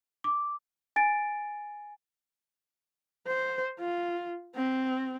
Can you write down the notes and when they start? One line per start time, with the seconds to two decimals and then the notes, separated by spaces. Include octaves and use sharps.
0.24 D6
0.96 G#5 A6 D7
3.27 C5
3.80 F4
4.55 C4